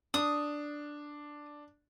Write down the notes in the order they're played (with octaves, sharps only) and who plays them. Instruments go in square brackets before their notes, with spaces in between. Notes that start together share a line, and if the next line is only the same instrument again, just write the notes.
[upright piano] D4 [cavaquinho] D#6